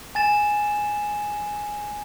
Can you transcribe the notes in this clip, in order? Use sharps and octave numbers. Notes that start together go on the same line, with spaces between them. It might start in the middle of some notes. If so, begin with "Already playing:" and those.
G#5 A6 E7